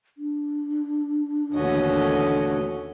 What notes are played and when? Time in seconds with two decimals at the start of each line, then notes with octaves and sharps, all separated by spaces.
0.18 D4
1.55 D#2 B2 D3 E3 A3 C#4 F#4 D#5